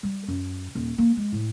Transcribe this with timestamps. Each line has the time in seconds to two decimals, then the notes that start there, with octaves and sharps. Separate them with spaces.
0.03 G3
0.28 F#2
0.75 D#1
0.98 A#3
1.17 G#3
1.32 A2